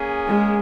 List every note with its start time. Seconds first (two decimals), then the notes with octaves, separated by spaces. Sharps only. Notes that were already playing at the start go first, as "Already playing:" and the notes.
Already playing: A#3 C#4 G#4
0.28 G#3